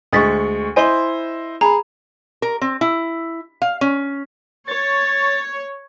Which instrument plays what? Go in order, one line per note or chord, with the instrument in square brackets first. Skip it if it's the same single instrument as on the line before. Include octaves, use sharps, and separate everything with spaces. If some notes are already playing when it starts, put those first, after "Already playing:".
[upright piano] D2 G#3 C#6 [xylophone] D#6 A6 B6
[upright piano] E4 C5 D#5 [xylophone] G#5 C6
[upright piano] G#4 [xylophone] A#5 B5
[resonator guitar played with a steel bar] A#4
C4
E4
F5
C#4
[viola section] C#5 [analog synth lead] A6